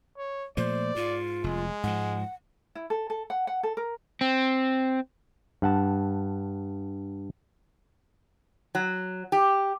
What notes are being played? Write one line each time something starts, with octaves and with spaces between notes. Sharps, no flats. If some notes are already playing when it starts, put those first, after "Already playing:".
C#5
A#2 F3 A3 C5 D5
G#2 F4
F1 G#3
G#2 F3 F#5
E4
A4
A4
F#5
F#5
A4
A#4
C4
G2 F#5 A5
F#3
G4